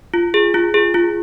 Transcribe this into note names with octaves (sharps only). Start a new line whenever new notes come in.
F4
G#4
F4
G#4
F4